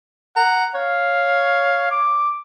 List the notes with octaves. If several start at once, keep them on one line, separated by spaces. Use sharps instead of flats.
F#5 A#5
C#5 F5
D6